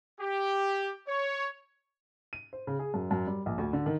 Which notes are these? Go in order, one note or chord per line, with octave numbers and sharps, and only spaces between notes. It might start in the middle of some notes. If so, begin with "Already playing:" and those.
G4
C#5
D#7
C5
C#3
G#4
F#2
F#2
G3
A#1
D2
D3
D#3